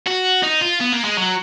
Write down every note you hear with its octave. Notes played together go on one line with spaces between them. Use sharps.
F#4
D#4
F4
B3
A#3
G#3
F#3